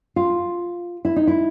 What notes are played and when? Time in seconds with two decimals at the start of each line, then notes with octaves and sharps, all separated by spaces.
0.16 F4
1.05 E4
1.16 D#4
1.27 E4